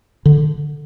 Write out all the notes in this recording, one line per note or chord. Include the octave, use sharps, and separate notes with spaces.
D3